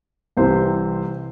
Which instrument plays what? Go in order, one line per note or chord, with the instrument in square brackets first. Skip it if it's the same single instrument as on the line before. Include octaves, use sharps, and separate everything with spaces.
[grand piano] C2 C3 E3 C5